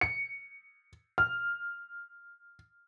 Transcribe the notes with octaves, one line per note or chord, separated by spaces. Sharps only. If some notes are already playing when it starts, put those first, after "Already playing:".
C#7
F6